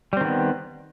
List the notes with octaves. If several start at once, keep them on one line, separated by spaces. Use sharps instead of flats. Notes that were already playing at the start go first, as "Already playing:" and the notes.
D#3 G3 B3 C4